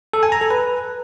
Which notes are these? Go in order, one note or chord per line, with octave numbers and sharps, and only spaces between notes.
A4
G#5
A#5
A4
B4